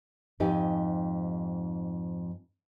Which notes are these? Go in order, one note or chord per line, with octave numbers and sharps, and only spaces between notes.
F2 G#2 D#4 G4 G5 G#5